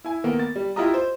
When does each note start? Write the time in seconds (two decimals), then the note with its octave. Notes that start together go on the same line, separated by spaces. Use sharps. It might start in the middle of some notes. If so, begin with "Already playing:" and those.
0.04 E4 G#5
0.24 D#3 A#3 B3
0.39 A6
0.56 G3
0.76 E4 F4 G4 D#5 A#5 D#6
0.94 C5